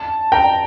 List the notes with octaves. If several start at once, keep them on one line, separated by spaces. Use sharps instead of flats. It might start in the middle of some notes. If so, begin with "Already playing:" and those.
Already playing: A5
G5 A#5